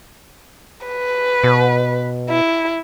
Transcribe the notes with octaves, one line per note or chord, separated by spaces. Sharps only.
B4
B2
E4